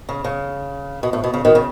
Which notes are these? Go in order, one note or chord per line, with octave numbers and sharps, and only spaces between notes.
C#3
C#3
B2
A2
B2
C#3
B2 D#3
C#3